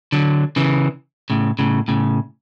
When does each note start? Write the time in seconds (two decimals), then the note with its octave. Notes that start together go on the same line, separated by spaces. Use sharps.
0.12 D3 F#3
0.56 C#3 E3
1.30 A2 C#3
1.59 A2 C#3
1.88 A2 C#3